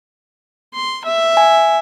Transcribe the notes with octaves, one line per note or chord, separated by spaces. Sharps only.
C6
E5
G#5